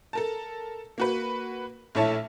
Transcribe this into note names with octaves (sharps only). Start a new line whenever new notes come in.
A4 A#4 A5
A#3 F#4 B4
A#1 A3 E4 C#5 E5 A5